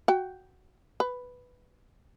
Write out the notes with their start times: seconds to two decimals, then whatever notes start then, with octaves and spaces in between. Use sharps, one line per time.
0.08 F#4 G5
1.00 B4